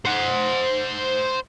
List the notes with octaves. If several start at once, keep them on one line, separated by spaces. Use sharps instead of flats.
C5 F#5